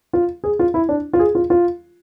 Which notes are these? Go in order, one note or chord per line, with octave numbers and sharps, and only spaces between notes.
F4
G#4
F4
E4
D4
F4
G#4
F4
F4